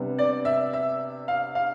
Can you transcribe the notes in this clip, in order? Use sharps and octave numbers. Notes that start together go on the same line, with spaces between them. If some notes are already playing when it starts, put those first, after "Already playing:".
Already playing: C3 G3 B3 D4
D5
E5
E5
F5
F5